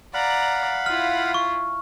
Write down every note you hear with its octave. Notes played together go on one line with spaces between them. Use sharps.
D5 F5 F#5 A#5 B5
E4 F4 F6
C#6